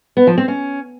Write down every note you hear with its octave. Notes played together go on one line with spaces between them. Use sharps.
B3
F3
C4
C#4